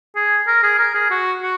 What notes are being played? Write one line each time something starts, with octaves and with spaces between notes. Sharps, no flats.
G#4
A#4
G#4
A#4
G#4
F#4
F#4